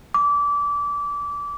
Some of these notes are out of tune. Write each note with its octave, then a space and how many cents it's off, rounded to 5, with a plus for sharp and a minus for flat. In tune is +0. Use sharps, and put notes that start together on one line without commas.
D6 -25